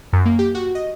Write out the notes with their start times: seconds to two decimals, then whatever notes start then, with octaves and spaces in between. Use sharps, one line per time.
0.13 F#2
0.26 A#3
0.39 G4
0.55 F#4
0.75 D#5